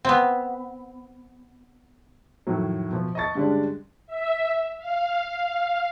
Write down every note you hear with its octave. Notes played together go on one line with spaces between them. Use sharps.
B3 C4
F2 A2 D#3 F#3
B2 F3
D#5 A5 C#6 A6
G2 D3 G3 G#3 C#4 D4
E5
F5